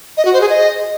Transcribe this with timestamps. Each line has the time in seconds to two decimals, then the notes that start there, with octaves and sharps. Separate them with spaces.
0.17 D#5
0.25 F#4
0.33 C5
0.41 G#4
0.49 D#5